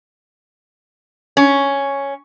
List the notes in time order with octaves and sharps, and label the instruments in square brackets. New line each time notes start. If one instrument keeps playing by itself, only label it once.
[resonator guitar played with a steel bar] C#4